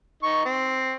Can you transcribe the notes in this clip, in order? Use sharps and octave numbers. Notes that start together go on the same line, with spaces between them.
D#4 C#6
C4